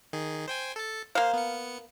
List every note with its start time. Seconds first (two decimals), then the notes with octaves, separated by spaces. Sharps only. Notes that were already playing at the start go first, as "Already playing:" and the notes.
0.13 D#3 G#4
0.48 C5 G5 G#5
0.76 A4 A5
1.15 A#3 C5 F5
1.33 B3 C#7